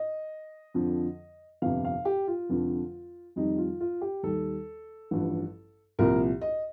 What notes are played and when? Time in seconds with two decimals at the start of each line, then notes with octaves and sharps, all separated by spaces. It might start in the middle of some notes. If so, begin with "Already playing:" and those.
Already playing: D#5
0.74 F2 D3 F3
1.62 G1 F2 C3 F5
1.85 F5
2.05 G4
2.27 F4
2.49 F1 F2 D3 F3
3.36 F2 D#3 G3 D#4
3.58 F4
3.81 F4
4.01 G4
4.23 D#2 D#3 G3 A4
5.11 A1 G2 F3
5.99 C2 A#2 F3 A#4
6.41 D#5